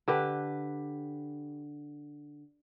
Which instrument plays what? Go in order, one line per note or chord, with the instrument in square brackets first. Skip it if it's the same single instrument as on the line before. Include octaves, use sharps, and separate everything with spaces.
[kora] D3 G4 B4